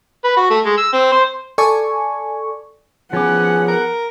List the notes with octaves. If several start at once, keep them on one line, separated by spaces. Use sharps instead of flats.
B4
F#4
A3
G#3
E6
C4
C5
A4 D5 G#5 C#6
F3 B3 C#4 G#4 F#5 D6
A#4